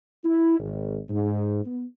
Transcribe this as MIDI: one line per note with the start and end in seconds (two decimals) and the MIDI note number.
0.25 0.58 64
0.58 0.97 32
1.10 1.64 44
1.64 1.84 59